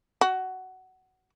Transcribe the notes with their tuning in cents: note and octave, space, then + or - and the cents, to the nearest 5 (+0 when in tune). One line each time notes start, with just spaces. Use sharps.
F#4 +15